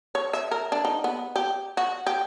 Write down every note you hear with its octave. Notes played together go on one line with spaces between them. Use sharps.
C#5
E5
A#4
D4
D#4
B3
G4
F#4
G4